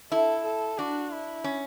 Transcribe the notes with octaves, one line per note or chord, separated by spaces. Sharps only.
E4 A4
A4
D4 F#4
E4
C#4